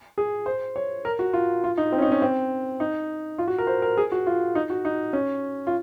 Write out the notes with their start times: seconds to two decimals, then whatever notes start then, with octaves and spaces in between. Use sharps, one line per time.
0.18 G#4
0.46 C5
0.76 C#5
1.05 A#4
1.19 F#4
1.33 F4
1.64 F4
1.78 D#4
1.92 C4
1.98 C#4
2.02 D#4
2.12 C#4
2.22 C4
2.80 D#4
3.38 F4
3.48 F#4
3.58 A#4
3.67 C5
3.82 A#4
3.97 G#4
4.12 F#4
4.27 F4
4.55 D#4
4.70 F#4
4.85 D#4
5.13 C#4
5.67 F4